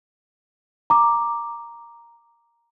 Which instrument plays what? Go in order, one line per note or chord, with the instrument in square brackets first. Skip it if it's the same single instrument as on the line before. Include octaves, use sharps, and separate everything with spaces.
[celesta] A#5 D6